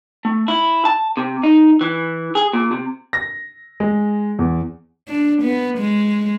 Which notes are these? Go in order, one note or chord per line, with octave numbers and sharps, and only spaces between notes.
A3
E4
A5
C3
D#4
E3
G#4
A#2
C3
A#6
G#3
E2
D4
B3
G#3